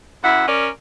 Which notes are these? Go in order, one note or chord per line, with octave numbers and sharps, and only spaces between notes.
F#2 E4 F#5
C#4 A#4 D5